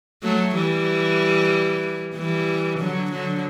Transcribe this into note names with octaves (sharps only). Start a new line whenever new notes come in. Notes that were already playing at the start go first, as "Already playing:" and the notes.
F#3 A3
E3 G3
E3 G3
D3 F#3
D3 F#3